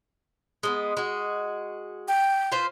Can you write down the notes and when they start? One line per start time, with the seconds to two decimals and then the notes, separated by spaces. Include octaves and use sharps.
0.63 G#3 A3 B3
0.97 G#3 F#4
2.08 G5
2.52 F4 B4 C5